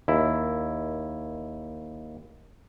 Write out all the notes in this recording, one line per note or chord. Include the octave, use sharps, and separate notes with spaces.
D#2 E4